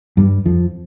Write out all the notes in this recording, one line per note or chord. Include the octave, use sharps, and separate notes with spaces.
G2 G3
F2 F3